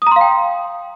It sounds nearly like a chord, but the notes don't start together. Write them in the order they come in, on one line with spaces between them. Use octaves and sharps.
D#6 A#5 C6 F5 G5